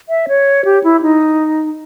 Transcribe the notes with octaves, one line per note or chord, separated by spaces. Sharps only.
E5
C#5
G4
E4
D#4